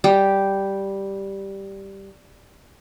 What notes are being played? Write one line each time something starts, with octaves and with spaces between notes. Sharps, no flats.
G3 G4